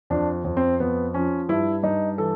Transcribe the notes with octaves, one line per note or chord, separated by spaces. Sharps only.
F2 D4
F2
C4
F2 B3
F3 C#4
G2 E4
G2 D#4
E3 A4